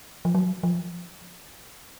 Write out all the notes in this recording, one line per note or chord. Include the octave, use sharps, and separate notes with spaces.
F3
F#3
F3